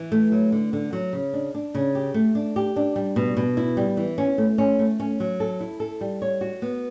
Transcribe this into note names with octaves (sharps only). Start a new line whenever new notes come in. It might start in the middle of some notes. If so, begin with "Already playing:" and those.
Already playing: E3
A3
F#3
D3
D3
F#3
C#3
D4
D4
C#3
G4
A3
D4
G4
D4
G3
B2
B2
E4
G3
E3
C#4
A3
C#4
A3
C#4
F#3
A4
E4
A4
G3
C#5
F#4
B3